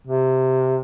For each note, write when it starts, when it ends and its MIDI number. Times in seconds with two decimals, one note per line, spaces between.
0.07 0.82 48